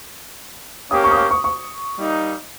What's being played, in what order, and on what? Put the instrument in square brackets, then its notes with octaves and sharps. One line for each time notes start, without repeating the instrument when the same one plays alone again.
[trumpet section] A#3 C#4 G4 [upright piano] D#6
[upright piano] C#6
D#6
C#6
C#6
C#6
[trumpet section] G3 A#3 D#4